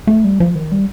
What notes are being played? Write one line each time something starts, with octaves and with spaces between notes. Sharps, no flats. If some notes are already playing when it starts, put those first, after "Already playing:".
A3
G3
F3
D#3
G3